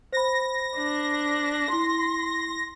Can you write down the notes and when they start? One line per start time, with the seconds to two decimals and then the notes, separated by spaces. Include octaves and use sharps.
0.13 C5 B5 A#6
0.77 D4
1.73 E4 C6